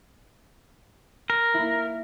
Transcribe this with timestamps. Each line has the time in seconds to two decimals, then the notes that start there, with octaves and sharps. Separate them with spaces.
1.30 A#4
1.54 A#3 E4